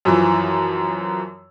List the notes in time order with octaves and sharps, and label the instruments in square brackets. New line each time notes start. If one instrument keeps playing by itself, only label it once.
[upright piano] F#2 E3 F3